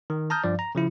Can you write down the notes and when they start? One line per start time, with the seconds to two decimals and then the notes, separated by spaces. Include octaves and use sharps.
0.10 D#3
0.30 A5 A#5 D#6 F6 G6
0.44 G2 F3 D5
0.59 A#5
0.75 C#3 F3 E4